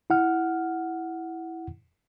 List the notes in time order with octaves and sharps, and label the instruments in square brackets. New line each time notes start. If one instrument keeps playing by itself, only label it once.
[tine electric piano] E4 F#5 F6